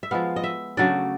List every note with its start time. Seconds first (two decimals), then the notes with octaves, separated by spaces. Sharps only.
0.03 E5
0.11 F3 G#3 B3 F5
0.36 D#5
0.44 E5
0.77 C#3 F#3 A3 D4 D5